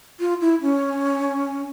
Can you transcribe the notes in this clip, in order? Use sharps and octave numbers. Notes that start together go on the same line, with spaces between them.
F4
E4
C#4